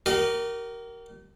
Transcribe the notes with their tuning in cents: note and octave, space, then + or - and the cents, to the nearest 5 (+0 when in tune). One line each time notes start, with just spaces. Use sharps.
G4 -40 A#4 +0 D#5 -40